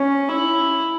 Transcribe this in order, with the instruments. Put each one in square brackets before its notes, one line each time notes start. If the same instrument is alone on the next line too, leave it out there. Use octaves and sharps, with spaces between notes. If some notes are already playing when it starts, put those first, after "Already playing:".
Already playing: [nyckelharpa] C#4
E4